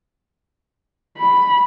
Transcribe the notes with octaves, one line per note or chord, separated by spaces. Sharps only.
B5